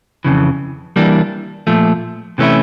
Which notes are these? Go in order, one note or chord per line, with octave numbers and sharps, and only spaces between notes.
F2 C#3 E3
E3 G3 A#3 D4
A#2 F3 A3
C3 E3 A3 C#4 E4